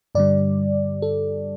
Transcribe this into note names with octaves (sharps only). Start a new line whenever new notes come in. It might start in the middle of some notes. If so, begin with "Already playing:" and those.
G2 D3 G3 D5
A4